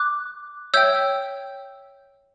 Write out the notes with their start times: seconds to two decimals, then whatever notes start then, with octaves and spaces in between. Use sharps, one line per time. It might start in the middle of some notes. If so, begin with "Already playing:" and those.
Already playing: D6 F#6
0.74 C#5 E5 G5 E6 G6